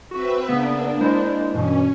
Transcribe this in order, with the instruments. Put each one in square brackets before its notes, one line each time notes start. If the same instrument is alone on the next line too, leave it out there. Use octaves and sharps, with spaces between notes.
[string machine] C4 B4 E5 [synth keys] F#4
[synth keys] C#3 B3 [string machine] A#3 D4
[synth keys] G#3 E4 C5
[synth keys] G2 B2 E3 [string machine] C#4